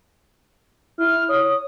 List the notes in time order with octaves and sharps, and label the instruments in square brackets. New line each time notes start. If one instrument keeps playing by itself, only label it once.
[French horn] E4 [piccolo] F6
[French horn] C#5 [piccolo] D#6